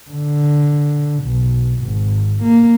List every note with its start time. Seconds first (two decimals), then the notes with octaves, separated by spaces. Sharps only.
0.10 D3
1.24 B1
1.79 G#1
2.43 A#3